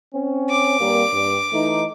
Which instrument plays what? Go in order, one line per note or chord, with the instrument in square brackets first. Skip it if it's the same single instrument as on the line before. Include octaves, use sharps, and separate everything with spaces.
[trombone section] C4 C#4
[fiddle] D6
[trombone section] G2 G3 A#3
G2
E3 A3 D#4